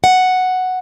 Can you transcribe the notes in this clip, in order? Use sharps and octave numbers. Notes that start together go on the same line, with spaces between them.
F#5